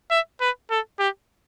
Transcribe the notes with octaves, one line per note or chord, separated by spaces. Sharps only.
E5
B4
A4
G4